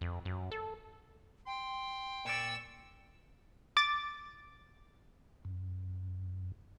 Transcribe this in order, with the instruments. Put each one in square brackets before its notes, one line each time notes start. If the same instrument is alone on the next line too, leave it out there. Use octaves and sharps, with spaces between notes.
[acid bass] F2
F#2
A4
[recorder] G5 [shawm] C6
[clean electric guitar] A#2 D5 [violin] C#6 E6
[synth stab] D6 A6
[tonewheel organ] F#2